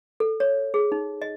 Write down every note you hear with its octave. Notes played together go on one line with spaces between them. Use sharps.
A4
C#5
G#4
D#4
D#5